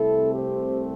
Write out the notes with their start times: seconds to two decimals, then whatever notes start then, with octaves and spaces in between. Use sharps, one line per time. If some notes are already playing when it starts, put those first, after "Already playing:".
Already playing: C2 C3 A3 C4 E4 A4
0.33 G4 C5